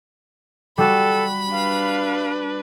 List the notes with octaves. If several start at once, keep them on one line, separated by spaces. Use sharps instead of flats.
G3 F#4 A4 B5
D4 B4 F5